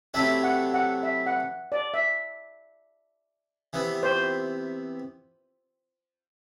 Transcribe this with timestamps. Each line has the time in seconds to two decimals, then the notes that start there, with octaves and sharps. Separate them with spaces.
0.14 C3 F#3 A3 C4 E4 E5
0.44 F#5
0.74 F#5
1.03 E5
1.26 F#5
1.72 D5
1.94 E5
3.73 C3 E3 B3
4.03 C5